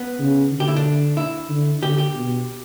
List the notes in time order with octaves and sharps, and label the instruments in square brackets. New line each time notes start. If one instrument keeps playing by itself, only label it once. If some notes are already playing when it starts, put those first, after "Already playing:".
Already playing: [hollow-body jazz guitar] B3
[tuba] C#3
D3
[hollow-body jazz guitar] G4
E4
D4
E4
[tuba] D3
[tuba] D3 [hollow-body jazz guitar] G4
[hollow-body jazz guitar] G4
[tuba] B2